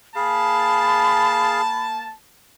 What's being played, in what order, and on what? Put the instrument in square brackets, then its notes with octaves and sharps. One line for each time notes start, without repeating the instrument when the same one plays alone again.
[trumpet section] A#3 A5 [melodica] G#4 F5 [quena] B5